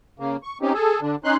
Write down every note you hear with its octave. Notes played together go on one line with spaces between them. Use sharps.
C#3 A#3
C#6
C4 C#4 D#4 G4
G#4 A4
D3 D4
C#4 D#4 C6 F#6